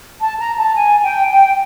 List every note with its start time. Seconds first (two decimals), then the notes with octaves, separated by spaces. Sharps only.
0.20 A5
0.39 A#5
0.58 A5
0.75 G#5
1.03 G5
1.30 G5